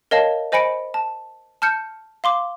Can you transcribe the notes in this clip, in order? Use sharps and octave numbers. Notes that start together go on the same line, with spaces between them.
A#4 C#5 D#5 F5 A5
C5 D#5 G#5 B5 C#7 D7
A5
A5 F6 G6 C#7
F5 C6 D6